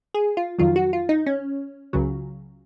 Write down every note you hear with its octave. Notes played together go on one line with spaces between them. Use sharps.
G#4
F4
F2 D#3 F#3 F4
F#4
F4
D#4
C#4
C#2 C#3 F#3